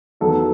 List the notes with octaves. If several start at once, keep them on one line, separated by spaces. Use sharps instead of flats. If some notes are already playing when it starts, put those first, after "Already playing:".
E2 D#3 F#3 B3 A4